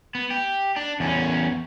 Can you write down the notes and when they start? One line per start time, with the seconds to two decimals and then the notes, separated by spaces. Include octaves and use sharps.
0.15 B3
0.31 G4
0.77 D4
1.00 E2 C#4